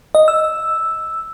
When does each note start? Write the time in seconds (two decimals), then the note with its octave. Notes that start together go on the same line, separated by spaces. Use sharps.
0.15 D#5
0.28 E6